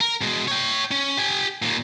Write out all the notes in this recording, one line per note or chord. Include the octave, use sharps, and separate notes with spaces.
A#4
B2 G#3
C#5 G5
C#4
G4 G#5
D#2 A#2